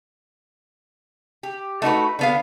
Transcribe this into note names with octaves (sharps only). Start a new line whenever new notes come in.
G4
A3 D#4 F#4 B4
D3 B3 F5